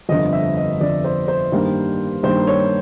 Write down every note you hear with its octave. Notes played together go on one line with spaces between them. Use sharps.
G1 F2 D3 F3 D#5
E5
D#5
G1 F2 D3 F3 D5
C5
C5
G2 D#3 G3 A#3
G2 D#3 G3 A#3 C5
C#5